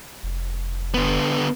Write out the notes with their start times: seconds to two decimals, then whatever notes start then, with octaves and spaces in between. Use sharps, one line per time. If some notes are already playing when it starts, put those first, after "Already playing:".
0.23 F1
0.94 D3 B3